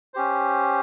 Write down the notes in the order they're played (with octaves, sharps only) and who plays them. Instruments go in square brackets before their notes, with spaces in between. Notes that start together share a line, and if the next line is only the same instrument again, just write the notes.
[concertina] C#4 G4 C5